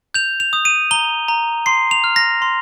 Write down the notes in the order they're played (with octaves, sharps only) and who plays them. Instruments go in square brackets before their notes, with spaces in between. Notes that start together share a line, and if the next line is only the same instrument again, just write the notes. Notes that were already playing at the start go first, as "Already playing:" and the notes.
[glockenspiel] G6 F7
F7
D#6
D#7
A#5 G7
A#5
C6 C7
F7
F6
A#6
C6